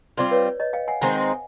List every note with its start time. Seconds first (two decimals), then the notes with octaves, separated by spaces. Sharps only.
0.17 G3 C4 F4 C5 D5
0.31 B4 C#5
0.60 C#5 D#5
0.73 F5 G5
0.88 F#5 G#5
1.01 D#3 G#3 C4 D#4 F#5 G#5